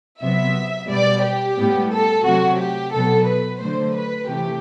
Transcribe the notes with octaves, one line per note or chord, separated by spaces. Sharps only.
C3 F#3 B3 E5
B2 G3 B3 D5
G4
A2 G3 B3
A4
C3 F#3 A3 F#4
G4
B2 F#3 B3 A4
B4
D3 F#3 A3 C5
B4
C3 E3 A3 G4